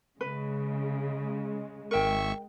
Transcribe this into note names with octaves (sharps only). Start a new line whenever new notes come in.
C#3 G#3 B4
G#1 A#4 E5 G5 C#6